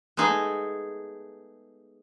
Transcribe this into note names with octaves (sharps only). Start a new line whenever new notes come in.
G#3 A3 B3 D#4 G#4